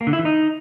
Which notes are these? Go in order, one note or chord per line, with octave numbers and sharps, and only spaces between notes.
A#3
D3
E4
E3
D#4